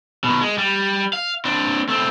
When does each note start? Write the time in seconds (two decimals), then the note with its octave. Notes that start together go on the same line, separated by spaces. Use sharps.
0.24 B2 D#3
0.41 G#3
0.58 G3
1.13 F5
1.45 C4 D4
1.89 A3 C4